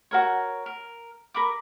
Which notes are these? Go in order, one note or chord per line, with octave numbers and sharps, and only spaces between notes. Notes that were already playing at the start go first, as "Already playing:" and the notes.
F#4 A#4 C#5
A#4
A#4 B5 D6